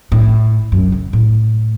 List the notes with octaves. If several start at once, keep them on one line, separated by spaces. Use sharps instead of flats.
A2
F#2
C#3
A2